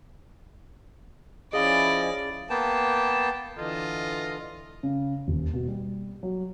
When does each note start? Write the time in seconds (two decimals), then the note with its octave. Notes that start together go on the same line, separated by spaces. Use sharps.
1.53 F3 C#4 E4 G#4 D5 D#5 F5 B5
2.50 A#3 B3 G5 A5
3.58 D3 E3 F4 A4 D#5
4.83 C#3
5.28 D#1
5.53 B2
5.68 G3
6.23 F#3